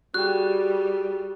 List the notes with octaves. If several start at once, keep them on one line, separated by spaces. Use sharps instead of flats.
G3 F#4 G#4 G5 F#6